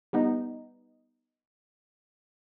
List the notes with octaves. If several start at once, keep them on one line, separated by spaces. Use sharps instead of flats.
G3 B3 D#4